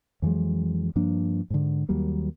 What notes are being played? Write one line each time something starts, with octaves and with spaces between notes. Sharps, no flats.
F2 E3 F#3 G#3
G2 F3 A#3 D4
G#2 D3
D#2 F#3 G3 A#3